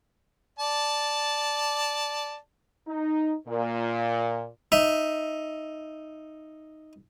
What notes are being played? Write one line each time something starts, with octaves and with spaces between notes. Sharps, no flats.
D5 A5
D#4
A#2
D#4 E5